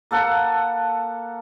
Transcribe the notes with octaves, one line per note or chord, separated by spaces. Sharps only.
A#3 A4 F#5